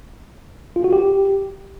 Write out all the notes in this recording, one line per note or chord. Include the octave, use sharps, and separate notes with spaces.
F4
F#4
G4